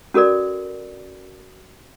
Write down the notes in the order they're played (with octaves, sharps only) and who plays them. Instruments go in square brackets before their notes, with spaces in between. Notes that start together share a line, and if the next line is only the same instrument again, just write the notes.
[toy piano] C#4 F#4 A4 A#4 D5